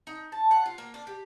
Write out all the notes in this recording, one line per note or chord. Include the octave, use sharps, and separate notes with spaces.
D#4
A5
F#5
F4
A#3
D4
G4